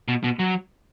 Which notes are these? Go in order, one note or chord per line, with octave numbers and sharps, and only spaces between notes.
B2
B2
F#3